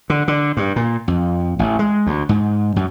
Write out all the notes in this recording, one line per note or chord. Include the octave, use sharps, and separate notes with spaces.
D3
D3
G2
A#2
F2
A1
G#3
D2
G#2
F#2